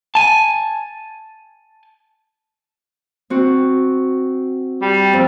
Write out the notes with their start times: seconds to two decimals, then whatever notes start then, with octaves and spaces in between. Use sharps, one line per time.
0.15 G#5 A5
3.30 C4 F#4
4.82 G3
5.13 F2